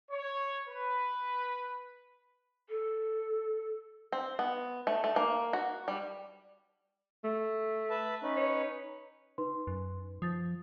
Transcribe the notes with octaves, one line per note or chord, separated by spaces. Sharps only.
C#5
B4
A4
C4
B3
A3
A3
A#3
F#4
G3
A3
B4 E5 A5
C#4 D#4 B4
C#5
D#4 B4 C6
F#2
F3 D#6 A6